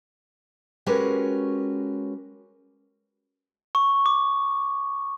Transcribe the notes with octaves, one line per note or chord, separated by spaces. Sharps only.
G#3 C#4 F#4 G4 A#4 B4
C#6
D6